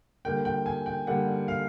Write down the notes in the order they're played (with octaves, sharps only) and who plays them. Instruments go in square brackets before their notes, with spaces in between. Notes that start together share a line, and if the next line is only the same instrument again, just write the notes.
[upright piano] D3 G3 A#3 G5
G5
G#5
G5
D3 G3 A#3 F#5
F5